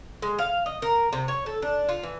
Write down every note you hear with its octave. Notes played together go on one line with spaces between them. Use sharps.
G#3
F5
D#5
A#4
C3
C#5
A4
D4
F4
E3